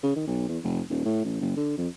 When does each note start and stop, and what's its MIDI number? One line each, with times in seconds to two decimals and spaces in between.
0.03 0.12 49
0.16 0.24 51
0.27 0.48 35
0.49 0.58 40
0.63 0.81 29
0.90 1.00 27
1.05 1.24 45
1.25 1.37 33
1.41 1.55 30
1.57 1.73 50
1.78 1.88 41